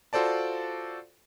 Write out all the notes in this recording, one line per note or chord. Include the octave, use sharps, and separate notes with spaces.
F4 F#4 A4 C5 D5 A5